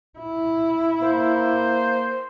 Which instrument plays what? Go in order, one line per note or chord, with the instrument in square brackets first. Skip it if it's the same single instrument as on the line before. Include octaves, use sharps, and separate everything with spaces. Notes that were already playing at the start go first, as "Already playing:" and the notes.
[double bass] E4
[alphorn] A#3 [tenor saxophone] C5